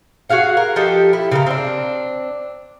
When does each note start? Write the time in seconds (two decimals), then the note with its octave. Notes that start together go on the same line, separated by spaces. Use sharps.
0.29 F#4 G#4 F5 F#5
0.57 A#4
0.76 F3 G4 A4 D#5
1.13 E4
1.32 C#3 A4 A#4
1.46 C4 D4